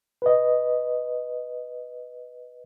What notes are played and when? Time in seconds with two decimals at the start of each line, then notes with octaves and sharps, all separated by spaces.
0.22 B4 D#5